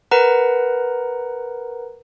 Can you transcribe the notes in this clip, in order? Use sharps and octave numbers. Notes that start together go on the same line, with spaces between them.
A#4 B4 F#5 A#5